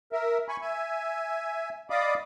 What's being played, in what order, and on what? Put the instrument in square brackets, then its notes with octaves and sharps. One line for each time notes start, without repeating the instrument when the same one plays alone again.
[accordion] A#4 E5
G#5 B5 C#6
E5 G#5
D5 D#5 F5 B5 D6 D#6